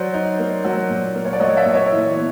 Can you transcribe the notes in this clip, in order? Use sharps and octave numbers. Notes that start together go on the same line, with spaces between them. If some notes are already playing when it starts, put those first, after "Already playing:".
Already playing: F#3 C5 D5
D#4
A#3
F#3
A#2
A#3
C#5
D5
F#3 C#5 D#5
D5 E5
A#2
C#5 D#5
E3
B3